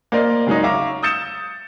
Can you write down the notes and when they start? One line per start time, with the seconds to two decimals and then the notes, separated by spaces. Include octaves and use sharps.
0.12 A#3 A#4 C5 D5 D#5
0.47 C#3 F#3 G#3 C#4 D#4
0.64 E5 F5 A#5 C#6 D6
1.03 D#6 E6 G6 A6 C#7 E7